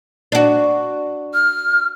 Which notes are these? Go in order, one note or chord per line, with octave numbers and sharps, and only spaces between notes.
D4 F#4
F6